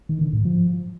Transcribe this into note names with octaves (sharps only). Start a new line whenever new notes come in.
D#3
D3
G#2
F3